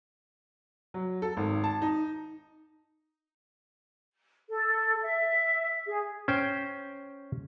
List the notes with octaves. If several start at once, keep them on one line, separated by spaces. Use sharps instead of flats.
F#3
A4
G#1
A5
D#4
A4
E5
G#4
C#4 C5 G5